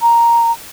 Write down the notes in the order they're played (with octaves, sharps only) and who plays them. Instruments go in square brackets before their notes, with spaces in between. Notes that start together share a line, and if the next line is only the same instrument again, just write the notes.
[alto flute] A#5